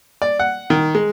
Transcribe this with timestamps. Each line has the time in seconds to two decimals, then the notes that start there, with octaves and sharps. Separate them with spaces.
0.22 D5
0.39 F#5
0.70 D#3
0.95 G#3